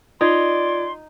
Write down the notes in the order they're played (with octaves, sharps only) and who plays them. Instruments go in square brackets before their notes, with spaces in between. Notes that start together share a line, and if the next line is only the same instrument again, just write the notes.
[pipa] D#4 [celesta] F4 G#6 [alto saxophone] D5 [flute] C6